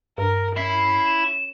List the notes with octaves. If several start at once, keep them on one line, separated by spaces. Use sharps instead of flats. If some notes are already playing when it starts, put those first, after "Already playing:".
G2 A#4
C#4 E4 E5 C7
E7